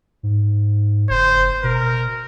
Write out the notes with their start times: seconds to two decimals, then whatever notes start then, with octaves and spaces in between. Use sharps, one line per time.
0.23 G#2
1.10 F#1 C5
1.63 B2 A#4